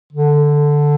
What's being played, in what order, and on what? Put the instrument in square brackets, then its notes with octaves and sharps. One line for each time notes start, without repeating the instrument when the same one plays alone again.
[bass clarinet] D3